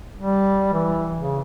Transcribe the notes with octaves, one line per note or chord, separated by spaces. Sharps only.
G3
E3
C#3